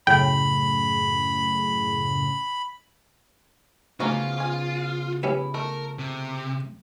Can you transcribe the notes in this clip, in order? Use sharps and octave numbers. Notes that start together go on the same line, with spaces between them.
F#2 A2 C#3 G5 B5
D2 C#3 F3 A#3 B3 C#4 F4 F#4
C#4 G#5
C#4 E4 G4 B4
A3 A#4
C3